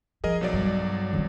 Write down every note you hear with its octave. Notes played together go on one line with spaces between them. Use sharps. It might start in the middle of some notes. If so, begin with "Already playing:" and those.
F3 G#4 A#4 D#5
B1 F#3 D5
G2
D#3 E4